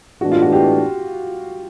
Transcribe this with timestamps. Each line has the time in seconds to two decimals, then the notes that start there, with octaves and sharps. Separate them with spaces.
0.21 A2 E3 G#3 B3 D4 F#4
0.32 F4
0.42 F#4
0.52 G4